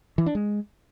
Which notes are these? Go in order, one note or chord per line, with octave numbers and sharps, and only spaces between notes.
E3
D4
G#3